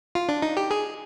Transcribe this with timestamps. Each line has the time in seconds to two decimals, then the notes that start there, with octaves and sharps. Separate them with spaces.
0.15 F4
0.29 D4
0.42 D#4
0.57 G4
0.71 G#4